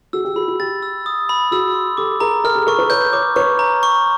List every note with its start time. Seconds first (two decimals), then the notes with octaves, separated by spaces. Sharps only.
0.13 F#4 G#4 E6
0.25 G4
0.36 F#4 G#4 B5
0.48 F#4
0.60 G4 A6
0.83 E6
1.06 D#6
1.29 B5
1.51 F#4 G#4 E6
1.74 C6
1.97 G4 A4 D6
2.20 G#4 A#4 A#5
2.44 G#4 A#4 F6
2.55 G4 A4
2.67 G#4 A#4 C#6
2.79 A4 B4
2.90 B4 C#5 G6
3.13 B4 C#5 D6
3.36 B4 C#5 C#6
3.59 A#5
3.83 C#6